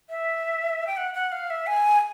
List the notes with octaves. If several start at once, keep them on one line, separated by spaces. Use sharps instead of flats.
E5
G5
F#5
F#5
F5
E5
G#5